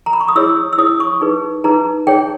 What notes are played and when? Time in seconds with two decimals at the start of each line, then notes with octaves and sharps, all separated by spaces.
0.06 A#5
0.13 B5
0.21 C#6
0.28 D#6
0.36 E4 G#4 C#5 E6
0.73 E6
0.78 E4 G#4 C#5 D#6
1.00 C#6
1.21 D#4 G#4 B4
1.64 D#4 G#4 B4 A#5
2.07 D#4 G#4 C#5 G5